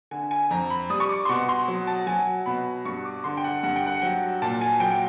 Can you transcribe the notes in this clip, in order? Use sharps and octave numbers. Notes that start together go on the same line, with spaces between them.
D3 G#5
G#5
F2 A#5
B5
G3 D#6
C#6
D6
C6
B2 C#6
C6
F#3
A5
F#3 G#5
B2 B5
G2 C#6
D6
D3 C6
G5
F#5
G2 F#5
G5
F#5
F#3 G5
A#2 A5
G#5
F#3 G5
G5